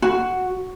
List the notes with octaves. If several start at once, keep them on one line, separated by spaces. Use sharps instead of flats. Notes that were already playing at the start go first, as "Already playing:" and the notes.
F#4